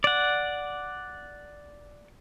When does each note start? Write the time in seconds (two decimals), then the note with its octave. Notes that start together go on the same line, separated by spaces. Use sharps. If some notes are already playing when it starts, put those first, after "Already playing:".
0.04 D5 F#5